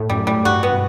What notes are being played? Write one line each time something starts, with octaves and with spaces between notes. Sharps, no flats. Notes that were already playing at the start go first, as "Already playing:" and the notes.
Already playing: A2
F#2 G3
A2 G3
G2 F#4
B3
B2